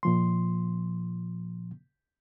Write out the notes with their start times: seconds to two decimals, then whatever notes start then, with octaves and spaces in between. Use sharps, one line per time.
0.03 A#2 F3 C6